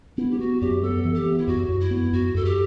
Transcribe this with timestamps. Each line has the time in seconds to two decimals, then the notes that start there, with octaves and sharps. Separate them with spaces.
0.18 B3 E4
0.30 G4
0.39 B3 F#4
0.61 F#2 G4
0.83 B3 A4
1.05 E3
1.14 G4
1.26 B3
1.38 E4
1.47 F#2 F#4
1.68 F#2
1.80 E4
1.91 B3
2.13 F#2 F#4
2.34 F#2 A4
2.45 G4